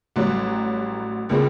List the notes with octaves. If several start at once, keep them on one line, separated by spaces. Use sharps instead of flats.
A1 F#3 G3
C#2 A#2 C#3 G#3 C4